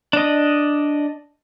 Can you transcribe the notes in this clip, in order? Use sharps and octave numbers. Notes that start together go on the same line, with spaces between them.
D4 D#5